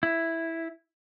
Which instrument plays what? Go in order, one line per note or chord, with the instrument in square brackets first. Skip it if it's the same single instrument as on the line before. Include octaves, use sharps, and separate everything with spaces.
[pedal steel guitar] E4